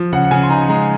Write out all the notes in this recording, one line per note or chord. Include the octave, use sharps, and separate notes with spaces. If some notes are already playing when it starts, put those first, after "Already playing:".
Already playing: F3
C#3 F#5
F#5
C#3 G#5
C6
D#4 A#5
G#3 A#5